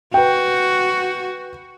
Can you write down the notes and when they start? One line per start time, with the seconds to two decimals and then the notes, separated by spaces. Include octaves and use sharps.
0.14 F#4 B4 G5